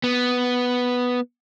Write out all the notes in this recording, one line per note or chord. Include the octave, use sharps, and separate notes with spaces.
B3